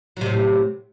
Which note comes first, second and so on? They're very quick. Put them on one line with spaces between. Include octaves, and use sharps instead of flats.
F#3 C3 A2